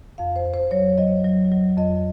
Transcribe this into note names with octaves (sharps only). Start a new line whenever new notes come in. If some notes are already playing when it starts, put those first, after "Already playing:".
F2 F5
C5
F2
C5
F#3 C#5
F#3 D#5
F#3
F#3
F2 D#5